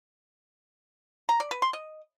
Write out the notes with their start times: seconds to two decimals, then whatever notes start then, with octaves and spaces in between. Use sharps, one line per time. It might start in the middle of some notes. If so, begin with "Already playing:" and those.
1.29 A#5
1.40 D5
1.51 B4
1.62 C6
1.73 D#5